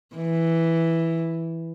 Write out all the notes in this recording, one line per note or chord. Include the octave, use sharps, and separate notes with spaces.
E3